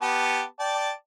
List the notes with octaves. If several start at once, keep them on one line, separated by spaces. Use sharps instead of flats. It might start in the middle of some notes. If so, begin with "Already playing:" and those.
B3 G4 A5
D5 G5 A5